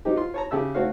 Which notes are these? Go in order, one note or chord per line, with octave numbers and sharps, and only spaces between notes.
F#3 C4 D#4 G4
F4 C6
C#5 A5 A#5
C#3 G4 E5 A5 E6
A3 C4 F#4 C#5 F5